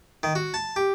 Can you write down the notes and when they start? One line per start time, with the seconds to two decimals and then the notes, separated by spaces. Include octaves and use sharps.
0.23 D#3
0.35 F#4
0.54 A5
0.76 G4